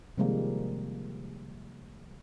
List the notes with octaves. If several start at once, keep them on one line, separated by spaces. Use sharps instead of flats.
C3 D#3 F3 G3 G#3 A#3